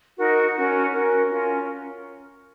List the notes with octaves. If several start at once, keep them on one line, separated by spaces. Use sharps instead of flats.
D#4 F#4 A#4
C#4 F#4 A#4
C#4 F#4 A#4
C#4 F4 A#4